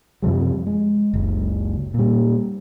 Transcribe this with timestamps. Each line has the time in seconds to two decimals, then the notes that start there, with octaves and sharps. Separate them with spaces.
0.22 F#2 C3 F3 G3
0.67 G#3
1.14 F#1 C#2
1.94 A#2 G3